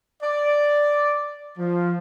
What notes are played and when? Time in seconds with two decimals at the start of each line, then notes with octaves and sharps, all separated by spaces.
0.22 D5
1.58 F3